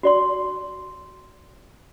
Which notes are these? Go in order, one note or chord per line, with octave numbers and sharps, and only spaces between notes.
F#4 D5 C6